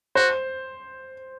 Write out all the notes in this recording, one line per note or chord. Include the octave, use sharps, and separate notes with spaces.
F#4 C5